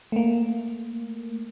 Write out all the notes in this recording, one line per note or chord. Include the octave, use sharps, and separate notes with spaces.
A3 A#3